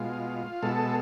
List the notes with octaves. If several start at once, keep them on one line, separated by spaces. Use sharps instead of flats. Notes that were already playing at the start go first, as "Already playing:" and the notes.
Already playing: B2 G#3 F4
B2 G#3 A4